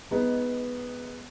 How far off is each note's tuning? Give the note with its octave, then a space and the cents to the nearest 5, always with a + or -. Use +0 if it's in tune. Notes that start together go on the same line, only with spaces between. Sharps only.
G#3 +0 B3 +0 D#4 +15